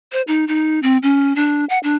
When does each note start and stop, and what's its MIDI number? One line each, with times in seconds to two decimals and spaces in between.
0.13 0.22 72
0.28 0.45 63
0.48 0.80 63
0.83 0.98 60
1.03 1.35 61
1.36 1.65 62
1.69 1.79 78
1.83 1.96 62